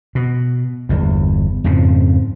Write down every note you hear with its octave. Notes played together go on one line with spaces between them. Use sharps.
B2
G1 E2
F2 G#2 C#3